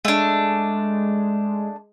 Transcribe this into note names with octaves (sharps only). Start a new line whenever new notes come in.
G#3 A3 D4